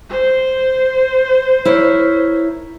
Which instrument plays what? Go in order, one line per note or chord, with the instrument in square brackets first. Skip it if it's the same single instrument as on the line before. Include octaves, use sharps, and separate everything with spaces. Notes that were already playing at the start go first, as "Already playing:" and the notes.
[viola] C5
[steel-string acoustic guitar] E4 A#4 C#5